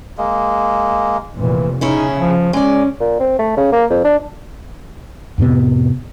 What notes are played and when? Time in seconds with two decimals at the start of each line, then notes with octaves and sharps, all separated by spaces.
0.18 G#3 A#3
1.34 F1 A#2 E3
1.81 C#3 C#4 D#4 E4 G#4
2.19 F3
2.53 G#3 C#4 D5
3.00 A#2
3.20 C4
3.39 A3
3.57 C#3
3.72 A#3
3.90 F2
4.04 D4
5.38 F2 A2 C3 B3